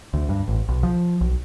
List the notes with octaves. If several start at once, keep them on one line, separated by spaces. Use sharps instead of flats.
D2
G2
A1
B1
F3
B1